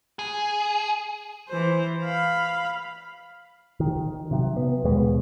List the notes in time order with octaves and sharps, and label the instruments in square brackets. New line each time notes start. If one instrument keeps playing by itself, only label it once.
[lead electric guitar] G#4
[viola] E3 C5
F5 B5
[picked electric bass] D#3
C3 F#3
B3
D#2 B2 G#3 B3